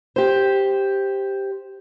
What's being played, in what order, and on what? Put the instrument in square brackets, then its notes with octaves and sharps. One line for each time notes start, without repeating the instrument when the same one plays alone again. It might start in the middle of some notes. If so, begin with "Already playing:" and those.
[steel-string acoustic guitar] G4 C5